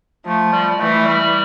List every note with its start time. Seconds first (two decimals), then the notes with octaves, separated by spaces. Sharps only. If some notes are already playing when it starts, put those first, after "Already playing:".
0.26 F3 A3
0.53 G3
0.71 G3
0.79 E3 A3
1.05 G3